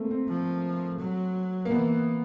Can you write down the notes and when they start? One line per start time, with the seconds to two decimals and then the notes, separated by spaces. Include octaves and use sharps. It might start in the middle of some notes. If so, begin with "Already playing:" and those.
Already playing: A3 A#3 C4
0.11 C4
0.28 F3
0.99 F#3
1.65 A#3
1.70 E3 B3